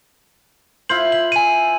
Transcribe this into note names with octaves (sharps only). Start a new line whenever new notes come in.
E4 F4 C5 F#7
F#7
G#5 D#7